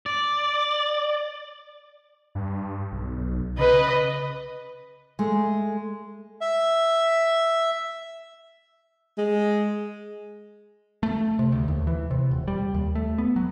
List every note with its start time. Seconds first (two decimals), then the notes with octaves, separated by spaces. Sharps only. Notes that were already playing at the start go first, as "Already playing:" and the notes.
0.06 D5
2.35 G2
2.92 B1
3.58 C#3 B4 D#5
5.19 G#3 A3
6.41 E5
9.18 G#3
11.03 A3
11.39 C3
11.52 D2
11.68 D#2
11.87 E3
12.11 C3
12.31 D#1
12.48 G3
12.74 D#2
12.95 A3
13.18 B3
13.36 F#3